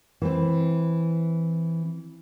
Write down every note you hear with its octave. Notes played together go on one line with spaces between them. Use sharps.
E3 C4